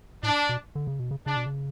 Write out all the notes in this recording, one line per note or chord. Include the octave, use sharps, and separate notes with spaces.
A2 D4
B2
D3
C#3
B2
C#3
C#3 D4
B2
C#3